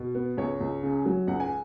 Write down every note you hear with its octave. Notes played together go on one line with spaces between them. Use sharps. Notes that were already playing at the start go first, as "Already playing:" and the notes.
Already playing: B2
B3
C#2 C#5
C#2
C#3
F#3
C#2 F#5
G#5